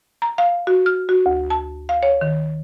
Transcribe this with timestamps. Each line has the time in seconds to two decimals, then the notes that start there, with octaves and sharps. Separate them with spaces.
0.22 A#5
0.38 F5
0.67 F#4
0.86 F6
1.09 F#4
1.26 D2
1.50 A5
1.89 F5
2.03 C#5
2.21 D#3